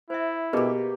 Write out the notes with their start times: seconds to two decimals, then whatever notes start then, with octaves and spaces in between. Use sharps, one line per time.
0.10 E4 C5 E5
0.53 B2 A#3 B3 G4 G#4 A#4 B4